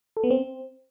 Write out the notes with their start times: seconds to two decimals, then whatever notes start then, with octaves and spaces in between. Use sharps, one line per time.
0.17 A4
0.24 B3
0.31 C4